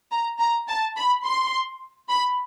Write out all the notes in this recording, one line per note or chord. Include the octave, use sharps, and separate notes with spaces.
A#5
A#5
A5
B5
C6
B5